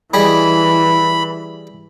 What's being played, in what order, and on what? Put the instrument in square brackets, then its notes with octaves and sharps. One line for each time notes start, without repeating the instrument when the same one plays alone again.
[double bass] E3 [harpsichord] G3 G#4 D#5 [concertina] B5